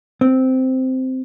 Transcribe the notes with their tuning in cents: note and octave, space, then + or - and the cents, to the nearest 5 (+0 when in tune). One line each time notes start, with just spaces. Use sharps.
C4 -10